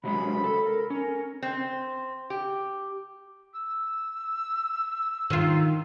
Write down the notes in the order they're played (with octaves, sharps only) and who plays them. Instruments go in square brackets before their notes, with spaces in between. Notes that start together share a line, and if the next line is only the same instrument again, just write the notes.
[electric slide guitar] C3 F#3 G#3 [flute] B5
[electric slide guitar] A4
[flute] A#4
[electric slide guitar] C#4 [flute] A#4
[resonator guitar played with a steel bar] C4
G4
[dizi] E6
[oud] D#3 F4